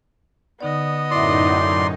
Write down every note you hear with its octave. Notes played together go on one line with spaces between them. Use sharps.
D3 B3 D#4 D5 D#5
F#2 A2 D#4 E4 D5 E5 C6